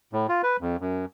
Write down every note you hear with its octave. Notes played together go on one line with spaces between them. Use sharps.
A2
F4
B4
F2
F#2